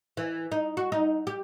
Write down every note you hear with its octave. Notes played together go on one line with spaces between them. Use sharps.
E3
D#4
F#4
D#4
G4